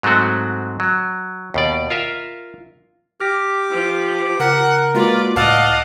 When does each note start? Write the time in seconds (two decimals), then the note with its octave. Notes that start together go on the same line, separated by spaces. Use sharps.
0.03 G#2 F#3 G#3 A3 C4 F#4
0.80 F#3
1.54 D#2 B2 D5
1.90 F4 A#4 E5 F5
3.21 G4 D6 F6 A#6
3.71 F3
4.40 C#3 A#4 F#5
4.95 G#3 A#3 F4 F#4 B4 D5
5.36 C#2 A2 D5 D#5 F5 F#5 A5 E6